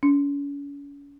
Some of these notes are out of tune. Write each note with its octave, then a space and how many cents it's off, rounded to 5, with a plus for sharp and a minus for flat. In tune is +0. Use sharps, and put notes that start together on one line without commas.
C#4 +40